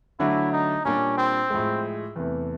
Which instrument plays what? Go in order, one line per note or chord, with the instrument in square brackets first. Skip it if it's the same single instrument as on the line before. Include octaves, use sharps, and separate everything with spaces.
[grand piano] D3 F#3 A3 D4 F#4 [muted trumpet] E4
[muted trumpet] D#4
[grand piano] A#2 G3 A#3 D4 [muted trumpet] C#4
[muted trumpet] C4
[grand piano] A2 F3 G#3
E2 C3 E3 A3